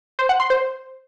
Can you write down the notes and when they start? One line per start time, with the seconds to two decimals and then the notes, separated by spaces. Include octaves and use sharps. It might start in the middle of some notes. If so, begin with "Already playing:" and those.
0.19 C5
0.29 F#5
0.40 C6
0.50 C5